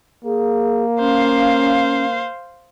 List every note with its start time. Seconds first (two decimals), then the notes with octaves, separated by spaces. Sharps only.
0.25 A#3 G#4
0.99 C#4 C5 F5